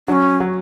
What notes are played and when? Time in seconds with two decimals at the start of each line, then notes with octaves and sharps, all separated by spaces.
0.08 F#3 C#4 D4
0.40 F#3